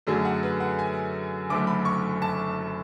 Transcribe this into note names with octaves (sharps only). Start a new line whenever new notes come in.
F#2 D3 F#3 A3 G#4
F#5
B4
F#5
G#5
F#1 F#2 D3 A3 D6
B5
C#6
A5